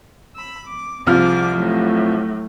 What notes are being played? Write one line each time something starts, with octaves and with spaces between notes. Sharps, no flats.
B5 E6
D6
C2 F3 G#4 D6 F6
A2 F#3